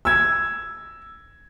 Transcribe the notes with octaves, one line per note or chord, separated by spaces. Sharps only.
E6 G#6